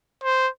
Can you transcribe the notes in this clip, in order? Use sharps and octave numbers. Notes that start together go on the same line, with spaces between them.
C5